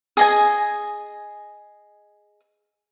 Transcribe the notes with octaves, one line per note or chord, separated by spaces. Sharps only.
G#4 D#5 G#5